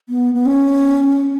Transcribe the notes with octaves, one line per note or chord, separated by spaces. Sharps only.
B3
B3
C#4